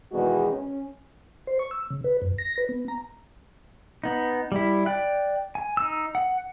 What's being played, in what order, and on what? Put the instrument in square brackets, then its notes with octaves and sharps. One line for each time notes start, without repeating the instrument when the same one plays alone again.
[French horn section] E2 B2 D#3 G#3 F#4
C#4
[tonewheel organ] C5
C#6
E6
C#3
B4
F#2
A#6
B4
B3
A#5
[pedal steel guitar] B3 D#4
G3 E4
D5 G5 F#6
G#5
D#4 E6
F#5